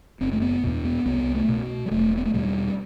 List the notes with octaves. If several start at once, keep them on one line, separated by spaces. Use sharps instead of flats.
F#1 C4
A3
B3
E2 B2
B3
C2 B3
A3
B2
G3
E1 A3
B3
A3
E2 B2 G3